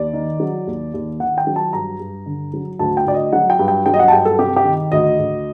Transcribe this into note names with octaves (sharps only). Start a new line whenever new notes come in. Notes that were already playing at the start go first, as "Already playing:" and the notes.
Already playing: D#2 D5
D#3
F#3
D#2
D#2
D#3 F#5
G5
F#3
A5
G2 A#5
G2
D3
F#3
D2 A5
G5
D2 D5
D#5
F#3 F#5
G5
G2
G5
F#3 G5
D#5
F#5
A5
G2 G5
A4
C3 G4
G4
D#3
D2 D#5
D2